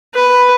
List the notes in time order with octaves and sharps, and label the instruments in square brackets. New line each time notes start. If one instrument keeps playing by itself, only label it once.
[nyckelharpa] B4